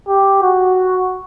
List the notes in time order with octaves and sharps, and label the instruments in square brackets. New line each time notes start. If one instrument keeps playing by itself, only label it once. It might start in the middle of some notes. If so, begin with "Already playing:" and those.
[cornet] G4
F#4